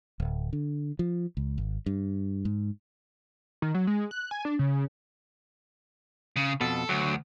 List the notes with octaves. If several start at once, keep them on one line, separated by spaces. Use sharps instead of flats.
D1
D3
F3
C#2
G#1
G2
G#2
D#3
F#3
G#3
F#6
G#5
D4
C#3
C#3
F2 B2 A4
D2 F#3